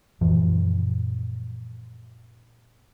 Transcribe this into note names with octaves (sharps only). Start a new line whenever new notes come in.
F#2 A#2 E3 F3